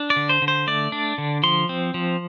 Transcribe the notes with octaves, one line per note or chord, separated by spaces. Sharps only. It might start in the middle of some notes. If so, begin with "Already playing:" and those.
Already playing: D4
D5
D3
C5
D3
C5
A3 D5
D4
D3
F3 C6
C4
F3